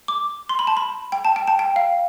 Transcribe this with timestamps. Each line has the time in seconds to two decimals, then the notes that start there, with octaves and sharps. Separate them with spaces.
0.08 D6
0.49 C6
0.59 B5
0.67 A5
0.77 B5
1.12 G5
1.25 A5
1.36 G5
1.47 A5
1.59 G5
1.76 F5